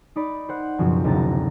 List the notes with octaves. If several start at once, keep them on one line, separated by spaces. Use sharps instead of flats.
D#4 D5 B5
C5 F#5 F#6
C#2 F#2 B2 F3 F#3 C4
F#1 D2 C3 A#5 A6